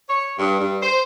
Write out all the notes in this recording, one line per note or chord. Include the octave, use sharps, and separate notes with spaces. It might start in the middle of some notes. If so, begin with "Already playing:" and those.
C#5
G2
G2
C5